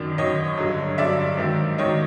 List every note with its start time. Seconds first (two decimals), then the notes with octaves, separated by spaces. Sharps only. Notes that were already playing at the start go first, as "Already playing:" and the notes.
Already playing: F#2 D#3 F#3 D5
0.18 F#2 D#3 F#3 C#5 D#5
0.58 G2 D3 F#3
0.98 G2 D3 F#3 D5 E5
1.38 G#2 D#3 F#3
1.78 G#2 D#3 F#3 C#5 D#5